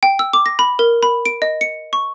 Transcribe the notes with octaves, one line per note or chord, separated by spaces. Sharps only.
G5
E6
D6
A#6
B5
A#4
B5
D7
D#5
C#7
C#6